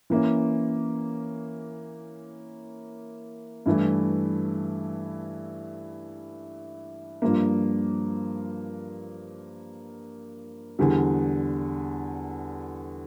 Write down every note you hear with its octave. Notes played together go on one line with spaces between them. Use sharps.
E3 A#3 C#4
G2 E3 A3 E4
G2 F3 A#3
E2 D3 G3